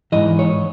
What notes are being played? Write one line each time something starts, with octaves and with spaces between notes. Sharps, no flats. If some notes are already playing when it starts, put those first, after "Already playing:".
G#2 E3 D#5
C#5